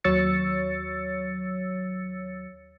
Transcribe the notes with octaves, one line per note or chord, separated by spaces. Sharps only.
D#2 F#3 C#5 E6 A6 C#7